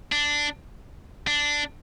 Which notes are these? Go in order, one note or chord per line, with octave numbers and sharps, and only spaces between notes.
D4
D4